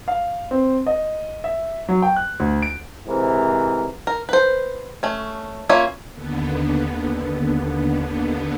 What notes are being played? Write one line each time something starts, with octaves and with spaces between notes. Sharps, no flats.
F5
C4
D#5
E5
F#3
G5
F#6
D2
D7
G#2 C3 E3 A#4
A#4
B4 C5
A3 C#4
A#3 C#4 F4 C#5 E5
D#2 D3 B3